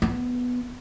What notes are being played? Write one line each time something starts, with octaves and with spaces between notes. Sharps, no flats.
B3